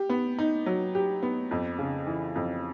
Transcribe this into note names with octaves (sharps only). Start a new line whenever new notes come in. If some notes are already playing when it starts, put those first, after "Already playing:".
Already playing: G4
B3
D#4
F#3
G4
B3
F2
C#3
E3
F2